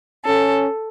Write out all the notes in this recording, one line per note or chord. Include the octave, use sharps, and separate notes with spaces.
C#4 A4